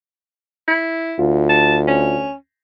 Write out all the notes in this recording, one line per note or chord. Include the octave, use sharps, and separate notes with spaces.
E4
D2 F4
A5
C#4